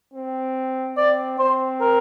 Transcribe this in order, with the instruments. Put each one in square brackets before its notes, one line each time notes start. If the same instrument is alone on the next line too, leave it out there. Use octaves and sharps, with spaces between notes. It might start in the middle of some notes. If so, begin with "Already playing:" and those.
[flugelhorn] C4
[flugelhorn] C4 [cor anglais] D5
[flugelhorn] C4 [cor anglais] C5
[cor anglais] A#4